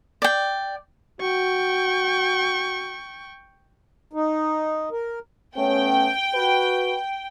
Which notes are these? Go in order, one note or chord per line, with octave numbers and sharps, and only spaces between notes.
D5 G5
F#4 G5 C#6
D#4
A#4
A3 B3 C#4 G5
F#4 B4